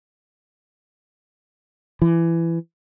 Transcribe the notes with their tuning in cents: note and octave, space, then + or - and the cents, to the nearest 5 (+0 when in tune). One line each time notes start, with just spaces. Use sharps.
E3 +20